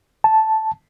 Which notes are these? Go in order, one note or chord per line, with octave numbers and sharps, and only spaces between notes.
A5